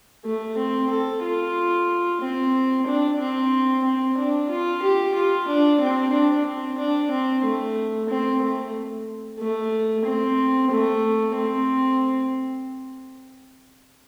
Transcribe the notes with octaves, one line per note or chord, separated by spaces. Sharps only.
A3
C4
A4
F4
C4
D4
C4
C4
D4
F4
G4
F4
D4
C4
D4
C4
D4
C4
A3
C4
A3
A3
C4
A3
C4